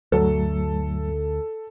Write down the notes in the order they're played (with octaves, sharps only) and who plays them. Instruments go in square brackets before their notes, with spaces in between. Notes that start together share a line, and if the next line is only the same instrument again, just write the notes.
[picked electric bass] D2 [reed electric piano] G2 F#3 A3 [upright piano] A4